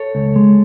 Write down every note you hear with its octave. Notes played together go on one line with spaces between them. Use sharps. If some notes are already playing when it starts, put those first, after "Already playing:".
Already playing: A4 C#5
C#2
G#3